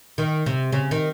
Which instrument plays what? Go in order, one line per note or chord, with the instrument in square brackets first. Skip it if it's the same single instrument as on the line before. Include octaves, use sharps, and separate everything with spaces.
[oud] D#3
C3
C#3
D#3